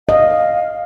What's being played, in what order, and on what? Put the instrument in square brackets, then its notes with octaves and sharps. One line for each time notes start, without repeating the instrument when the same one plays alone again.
[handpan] D#5 [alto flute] F5